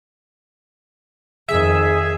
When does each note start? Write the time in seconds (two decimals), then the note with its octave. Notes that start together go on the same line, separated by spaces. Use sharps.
1.48 F2 D#3 G#4 E5